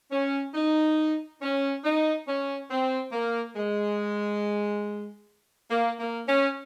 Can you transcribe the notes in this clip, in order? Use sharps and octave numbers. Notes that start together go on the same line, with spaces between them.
C#4
D#4
C#4
D#4
C#4
C4
A#3
G#3
A#3
A#3
C#4